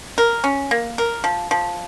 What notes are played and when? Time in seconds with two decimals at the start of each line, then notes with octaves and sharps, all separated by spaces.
0.18 A#4
0.44 C#4
0.71 A#3
0.98 A#4
1.24 F3
1.51 F3